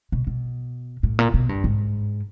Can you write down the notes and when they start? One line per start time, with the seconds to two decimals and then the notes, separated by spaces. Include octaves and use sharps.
0.12 B2
0.27 B2
1.03 A2
1.19 A#2
1.34 B2
1.49 G2
1.64 G#2